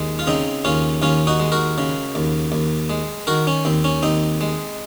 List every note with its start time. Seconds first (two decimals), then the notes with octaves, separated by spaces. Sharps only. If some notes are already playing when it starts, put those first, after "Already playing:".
Already playing: D#2 G#3
0.19 F4
0.27 C#3 C4 D#4
0.65 D#2 C#4 F4
1.02 D#2 C#4 F4
1.27 D#4 F#4
1.40 G#3
1.52 F#4 A#4
1.78 C#3
2.15 D#2
2.52 D#2
2.90 G#3
3.27 D#3 F#4 A#4
3.47 C#4
3.65 D#2 C4
3.84 C#4
4.03 D#2 C4 D#4
4.41 G#3